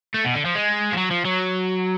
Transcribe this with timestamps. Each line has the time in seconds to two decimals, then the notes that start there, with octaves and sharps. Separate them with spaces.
0.14 A3
0.25 B2
0.35 D3
0.45 F3
0.55 G#3
0.93 F3
0.97 F#3
1.11 F3
1.25 F#3